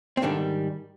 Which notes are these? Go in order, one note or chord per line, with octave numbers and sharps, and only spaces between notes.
C4
G#2 D3 D#3 G3 D4